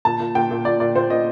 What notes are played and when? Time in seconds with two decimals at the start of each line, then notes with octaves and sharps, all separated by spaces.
0.05 A#2 A5
0.20 A#2
0.35 A#2 G5
0.51 A#2
0.65 A#2 D5
0.80 A#2 D5
0.96 A#2 C5
1.10 A#2 D#5